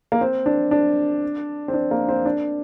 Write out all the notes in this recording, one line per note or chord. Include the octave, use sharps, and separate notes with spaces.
A#3
C4
D4
D4
C4
D4
A#3
C4
D4